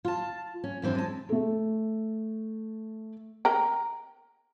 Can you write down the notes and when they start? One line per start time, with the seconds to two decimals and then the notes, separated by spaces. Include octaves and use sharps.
0.05 F4 A5
0.64 C#4
0.82 F#2 E3 C4 D4
0.95 G#3 A5
1.29 A3 A4
3.45 A#4 G5 A#5